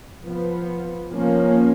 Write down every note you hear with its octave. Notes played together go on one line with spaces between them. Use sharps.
F3 B3
F3 A#3 C#4